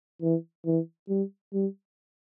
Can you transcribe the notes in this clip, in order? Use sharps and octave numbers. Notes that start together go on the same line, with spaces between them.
E3
E3
G3
G3